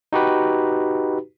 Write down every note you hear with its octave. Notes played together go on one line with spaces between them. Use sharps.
D#4 F#4 G4 B4